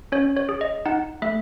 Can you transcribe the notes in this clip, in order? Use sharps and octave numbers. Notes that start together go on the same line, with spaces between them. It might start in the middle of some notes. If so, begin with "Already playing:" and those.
C#4 C#5
C#5
G#4
D#5
D#4 F#5
A3 E5